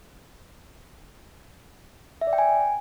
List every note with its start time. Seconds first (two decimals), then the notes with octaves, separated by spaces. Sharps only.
2.21 E5
2.27 D5
2.33 G5
2.38 G#5